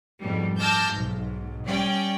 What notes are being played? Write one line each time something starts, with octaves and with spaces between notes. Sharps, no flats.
F2 G#2 B2 G3
A5 D6 E6 F6 G6 A#6
B1 G#2
G3 C#4 D5 G5